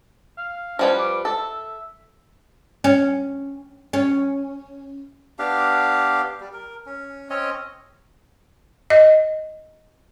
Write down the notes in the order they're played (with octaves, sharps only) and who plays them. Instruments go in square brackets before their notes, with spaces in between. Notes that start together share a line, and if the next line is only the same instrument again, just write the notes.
[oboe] F5
[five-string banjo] F3 G3 B4 [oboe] C#4
[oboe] D6
[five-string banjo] A4 [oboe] E5
[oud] C#4
C#4
[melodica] B3 D4 G4 F5
G3
A#4
C#4
C4 C#4 C#5 D#5
[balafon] D#5